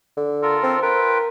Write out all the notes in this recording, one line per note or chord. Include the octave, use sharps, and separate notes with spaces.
D3
F4 A4 A#4
C4
F4 A#4 B4 G5